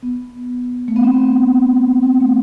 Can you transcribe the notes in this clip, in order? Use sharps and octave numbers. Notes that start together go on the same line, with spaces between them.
B3
A3
B3
C4
C4
A3